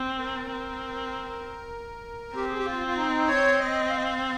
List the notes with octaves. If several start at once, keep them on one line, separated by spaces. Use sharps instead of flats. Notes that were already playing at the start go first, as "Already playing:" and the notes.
Already playing: C4
A#4
C4
C4 G4
G#4
G4
F4
F4
D#4
C#5
D#5
F5
D#5
F5